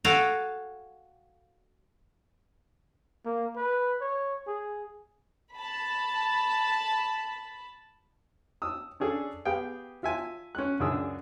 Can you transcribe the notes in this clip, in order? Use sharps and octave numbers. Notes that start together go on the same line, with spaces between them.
F#4 A4 F5 G5 G#5 A#5
A#3
B4
C#5
G#4
A5 B5
D#6 E6
C#4 D4 G#4 A4
B3 G4 G#4 F5 G5
F4 E5 G#5 A5
C#4 F#6
C#2 F#2 D4 G#4 D#6 E6